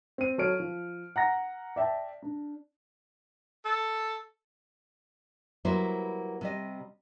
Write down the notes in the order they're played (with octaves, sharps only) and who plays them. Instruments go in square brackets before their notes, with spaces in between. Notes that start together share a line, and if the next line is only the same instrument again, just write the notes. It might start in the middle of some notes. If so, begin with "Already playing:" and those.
[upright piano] C4 D#7
F#3 A4 C#5 F6 D7
F3
F#5 A#5 A#6
D5 E5 G5 A5
D4
[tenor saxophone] A4
[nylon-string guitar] F#3 G3 A#3 E4 B4 C5
C3 G3 D#5